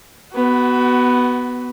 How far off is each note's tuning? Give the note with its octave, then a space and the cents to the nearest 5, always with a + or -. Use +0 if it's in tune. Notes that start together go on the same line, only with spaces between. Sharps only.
B3 +0 F#4 +25